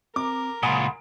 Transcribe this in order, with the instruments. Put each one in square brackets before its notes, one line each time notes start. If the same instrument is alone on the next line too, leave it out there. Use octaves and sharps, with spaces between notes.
[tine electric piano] C4 [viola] A#4 [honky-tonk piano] D6
[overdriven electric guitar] C#2 A#2 [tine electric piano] F#5 B5 C6 [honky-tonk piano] G#5 D#6 D7